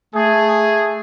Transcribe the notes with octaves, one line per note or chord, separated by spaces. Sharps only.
A3 G#4